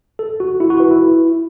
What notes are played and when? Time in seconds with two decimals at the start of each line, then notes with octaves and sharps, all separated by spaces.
0.19 A4
0.40 F#4
0.60 E4
0.70 F#4
0.80 B4
0.91 E4